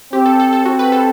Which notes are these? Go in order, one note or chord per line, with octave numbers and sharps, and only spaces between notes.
C4 G4
A4
A4
A4
C4 F#4
B4
A4